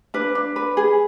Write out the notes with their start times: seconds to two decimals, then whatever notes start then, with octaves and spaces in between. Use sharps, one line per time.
0.14 D4 B4
0.35 D4
0.56 B4
0.77 G#4